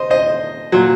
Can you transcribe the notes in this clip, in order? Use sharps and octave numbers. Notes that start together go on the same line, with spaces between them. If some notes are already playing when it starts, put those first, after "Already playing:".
Already playing: C5 D#5
C5 D#5
A#2 F#3